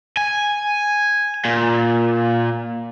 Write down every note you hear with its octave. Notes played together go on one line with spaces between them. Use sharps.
G#5
A#2